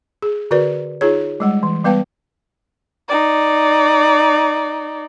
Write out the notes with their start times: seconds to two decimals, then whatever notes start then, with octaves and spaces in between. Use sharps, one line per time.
0.22 G#4
0.51 D3 F#4 A#4 B4 D5
1.01 D#4 F4 G#4 C#5
1.40 G3 G#3 F#5
1.63 E3
1.85 G3 B3 B4 F5 G5 A5
3.09 D#4 D5